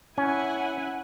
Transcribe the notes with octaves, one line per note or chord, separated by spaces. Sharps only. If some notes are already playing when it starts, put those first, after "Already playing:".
C#4 E4 F#5 G#5